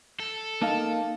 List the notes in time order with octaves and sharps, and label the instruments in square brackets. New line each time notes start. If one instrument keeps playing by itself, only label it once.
[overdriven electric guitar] A4
[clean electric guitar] A#3 D#4 [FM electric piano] F5 A5